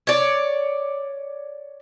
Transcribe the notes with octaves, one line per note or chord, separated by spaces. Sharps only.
C#5 D5